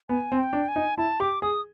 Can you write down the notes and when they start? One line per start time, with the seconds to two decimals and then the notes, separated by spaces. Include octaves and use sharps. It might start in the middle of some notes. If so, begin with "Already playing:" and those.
0.09 B3 G#5
0.32 C4
0.38 G5
0.53 D4
0.68 G#5
0.76 D#4
0.97 E4 A5
1.20 G4 D6
1.42 G#4 D#6